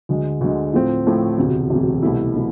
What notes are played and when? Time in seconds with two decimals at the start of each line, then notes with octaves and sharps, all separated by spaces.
0.09 D2 D3 G#3
0.41 D2 D3 G#3
0.73 A2 F3 A3 C4
1.07 A2 F3 A3 C4
1.38 E1 D2 C3
1.70 E1 D2 C3
2.03 C2 B2 A3 E4
2.35 B2 A3 E4